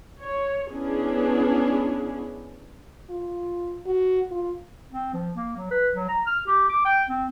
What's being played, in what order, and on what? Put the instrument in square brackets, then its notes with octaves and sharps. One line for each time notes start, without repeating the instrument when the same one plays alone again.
[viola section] C#5
B3 C#4 D4 E4 G#4
[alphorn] F4
F#4
F4
[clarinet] C4
F3
A#3
F#3
B4
F#3
A#5
F6
G4
D6
G5
C4